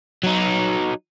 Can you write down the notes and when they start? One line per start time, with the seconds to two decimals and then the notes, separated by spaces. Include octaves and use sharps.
0.23 F#3 D#4